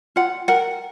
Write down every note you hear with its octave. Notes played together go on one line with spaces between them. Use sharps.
F4 F#5
A#4 F#5